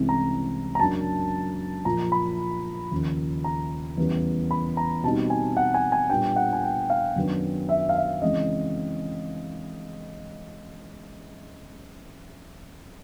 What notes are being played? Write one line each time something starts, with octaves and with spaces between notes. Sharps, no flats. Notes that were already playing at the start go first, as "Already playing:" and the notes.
Already playing: C2 C3 E3 G#3 C#4
A#5
A#5
F#2 C#3 F#3 A#3 D4 A5
A#2 F3 A#3 A#5
B5
D#2 C#3 F3
A#5
E2 C#3 E3 G3 B3
B5
A#5
B2 G3 C4 D#4 A5
G#5
F#5
G#5
G#5
A#2 G3 B3 D4 G5
F#5
G#5
G5
F5
F#2 D#3 F#3 B3 D4
E5
F5
E5
C#3 E3 G#3 C4 D#5